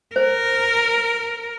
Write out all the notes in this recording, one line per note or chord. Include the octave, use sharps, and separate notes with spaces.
A#4 C5